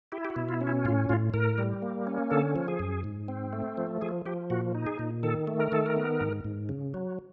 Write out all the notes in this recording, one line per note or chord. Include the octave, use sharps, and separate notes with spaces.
E4 G4
G4
F#4
B2
F4
C#4
E4
A2 F4
A2 F4
A2 A#4
G3
A#3
C#4
D3 A4
F3
G#4
F#2
G#2
C4
A3
F3
F3 G#4
F3 G4
A#2 F#4
D#4
G#4
A#2
D#3 A4
A3
A#4
D#3 A4
A#4
B3
G#2
G#2
C#3
F#3